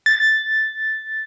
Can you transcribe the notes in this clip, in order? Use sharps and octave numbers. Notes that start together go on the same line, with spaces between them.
A6